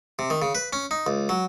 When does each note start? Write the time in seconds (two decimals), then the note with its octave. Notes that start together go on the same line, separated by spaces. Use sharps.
0.19 C3
0.30 D#3
0.42 C#3
0.55 B4
0.73 C#4
0.91 D#4
1.06 C#2
1.29 F#3